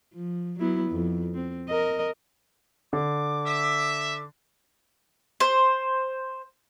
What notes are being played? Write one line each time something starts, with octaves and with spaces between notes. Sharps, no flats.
F3
F#3 B3 E4
F2
C4
A#4 D#5
D3 D6
E5
C5